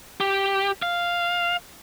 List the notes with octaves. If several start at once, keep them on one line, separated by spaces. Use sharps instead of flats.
G4
F5